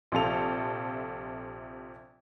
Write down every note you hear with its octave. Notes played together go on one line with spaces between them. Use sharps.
A#1 C3 F3 A4 F7